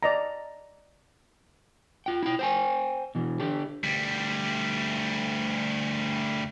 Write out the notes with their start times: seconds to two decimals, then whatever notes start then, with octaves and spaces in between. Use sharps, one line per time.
0.03 D5 D#5 A#5
2.06 F4 G5
2.23 E4 G5
2.39 C5 G5 G#5
3.15 B2 E3
3.40 D3 G4
3.84 D2 G3